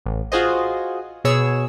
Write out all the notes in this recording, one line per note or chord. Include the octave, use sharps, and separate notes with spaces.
A1
F4 F#4 G#4 C5 D#5
B2 G#4 C#5 E6